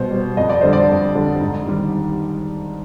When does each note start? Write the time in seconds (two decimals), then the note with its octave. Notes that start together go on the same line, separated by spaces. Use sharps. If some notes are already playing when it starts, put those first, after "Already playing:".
Already playing: B2 G3 C5
0.11 G3
0.37 F2 D#5
0.50 D5
0.61 D3 G3 C5
0.73 D5
0.90 F2
1.15 D3 G3
1.41 G#2
1.67 D#3 G3